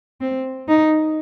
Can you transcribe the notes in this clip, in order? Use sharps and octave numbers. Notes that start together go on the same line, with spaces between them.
C4
D#4